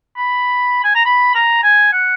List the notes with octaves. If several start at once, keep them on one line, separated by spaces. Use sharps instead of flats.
B5
G#5
A#5
B5
A#5
G#5
F#5